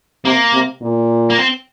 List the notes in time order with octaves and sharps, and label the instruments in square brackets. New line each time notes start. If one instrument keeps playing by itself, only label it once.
[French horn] C3 [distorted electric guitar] A#3
[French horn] C3
A#2
[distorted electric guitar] A#3
C4